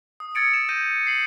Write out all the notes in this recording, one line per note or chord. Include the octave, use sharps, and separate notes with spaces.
D#6
E6 G#6 A6 C#7 D7
E7
G6 A#6 D#7
C7 F#7